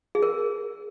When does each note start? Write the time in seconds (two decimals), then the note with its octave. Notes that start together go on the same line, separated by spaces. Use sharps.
0.15 G#4
0.23 A#4